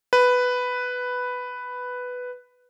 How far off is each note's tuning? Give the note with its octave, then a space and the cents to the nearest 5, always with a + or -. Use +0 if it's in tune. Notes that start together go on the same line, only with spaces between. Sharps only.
B4 +5